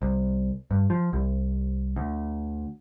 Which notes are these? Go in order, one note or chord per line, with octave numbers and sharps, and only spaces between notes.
C2
G2
F3
C2
D2